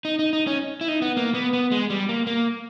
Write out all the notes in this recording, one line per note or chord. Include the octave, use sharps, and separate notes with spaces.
D#4
D#4
D#4
C#4
E4
D#4
B3
A#3
B3
B3
G#3
G3
A#3
A#3